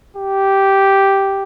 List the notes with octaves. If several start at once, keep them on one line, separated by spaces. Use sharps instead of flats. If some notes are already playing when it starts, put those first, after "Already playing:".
G4